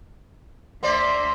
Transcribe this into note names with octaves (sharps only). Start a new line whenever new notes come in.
D2 A#3 C5 D5 E5 C6